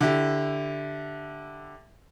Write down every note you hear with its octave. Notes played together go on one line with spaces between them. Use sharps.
D3 E4 G4